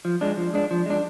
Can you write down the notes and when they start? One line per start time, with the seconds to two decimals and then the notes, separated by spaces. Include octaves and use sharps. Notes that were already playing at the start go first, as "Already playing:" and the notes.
0.05 F3
0.21 G#3 D4
0.37 F3
0.53 G#3 D4
0.71 F3
0.86 G#3 D4